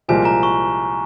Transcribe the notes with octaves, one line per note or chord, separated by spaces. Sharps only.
C2 A#2 F3 G#3 G#5
A#5
C#6